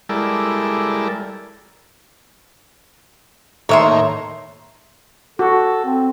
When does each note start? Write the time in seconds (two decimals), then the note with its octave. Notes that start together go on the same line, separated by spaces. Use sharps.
0.09 G3 G#3 E4 A4 A#4 D5
3.69 A2 D#3 A#3 C#5 E5 C6
5.39 F#4 A4
5.85 C4